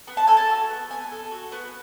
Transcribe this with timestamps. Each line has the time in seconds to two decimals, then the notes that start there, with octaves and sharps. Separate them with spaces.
0.07 B3
0.17 A5
0.27 A4 G#5
0.37 A5
0.49 F#4
0.69 B3
0.90 B3 G#5
1.11 A4
1.31 F#4
1.52 B3